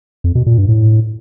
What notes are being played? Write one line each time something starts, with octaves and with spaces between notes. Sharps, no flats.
F2
B2
A#2
G2
A2